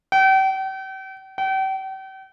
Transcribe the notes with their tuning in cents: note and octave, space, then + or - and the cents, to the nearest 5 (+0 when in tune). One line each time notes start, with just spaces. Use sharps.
G5 -40
G5 -40